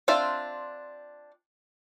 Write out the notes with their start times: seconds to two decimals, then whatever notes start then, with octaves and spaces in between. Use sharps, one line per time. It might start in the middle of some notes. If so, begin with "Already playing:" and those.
0.08 C4 D4 F4 D5 E5